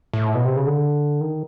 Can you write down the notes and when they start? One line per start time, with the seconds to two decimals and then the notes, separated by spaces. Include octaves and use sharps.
0.14 A2
0.35 B2
0.45 C3
0.56 C#3
0.67 D3
1.21 D#3